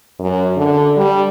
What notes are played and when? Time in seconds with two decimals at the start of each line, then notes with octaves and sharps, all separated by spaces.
0.19 F#2
0.57 D3
0.97 G3